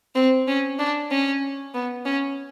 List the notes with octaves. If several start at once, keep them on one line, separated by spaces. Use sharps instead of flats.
C4
C#4
D4
C#4
B3
C#4